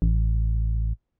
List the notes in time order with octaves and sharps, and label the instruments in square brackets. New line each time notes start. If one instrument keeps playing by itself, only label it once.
[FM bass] A1